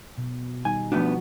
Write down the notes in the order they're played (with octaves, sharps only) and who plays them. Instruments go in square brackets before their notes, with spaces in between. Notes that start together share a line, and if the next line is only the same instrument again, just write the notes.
[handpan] B2
[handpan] D#3 G3 D#4 [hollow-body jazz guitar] G#5
[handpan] F3 F#4 [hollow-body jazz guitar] A3 B3 D4